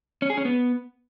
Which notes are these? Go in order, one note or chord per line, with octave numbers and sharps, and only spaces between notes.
C#4
G#4
C#4
B3